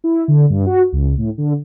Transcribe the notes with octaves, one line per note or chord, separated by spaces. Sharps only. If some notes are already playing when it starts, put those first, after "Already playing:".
E4
D3
G2
F#4
C#2
A2
D3